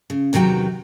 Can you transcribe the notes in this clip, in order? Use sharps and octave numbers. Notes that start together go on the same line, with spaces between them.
C#3
E2 C3 D#3 F#3 G5 A#5